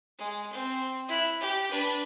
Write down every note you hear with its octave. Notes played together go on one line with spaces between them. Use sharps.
G#3
C4
E4 F#6
G4
D4 B4